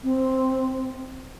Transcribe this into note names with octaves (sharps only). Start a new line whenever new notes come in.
C4